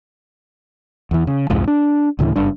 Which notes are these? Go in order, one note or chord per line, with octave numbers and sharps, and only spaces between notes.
E2 E3
C#3
C2 F2 G#2 F3
D4
D2 A2 C#3 E3
F#1 G2 D4